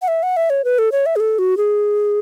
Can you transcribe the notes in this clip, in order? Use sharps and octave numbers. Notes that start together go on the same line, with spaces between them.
F#5
E5
F#5
E5
C#5
B4
A4
C#5
E5
G#4
A4
F#4
G#4